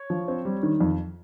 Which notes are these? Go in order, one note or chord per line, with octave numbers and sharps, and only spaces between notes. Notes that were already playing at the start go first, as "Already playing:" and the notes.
Already playing: C#5
F3
C4
G3
D#3
F2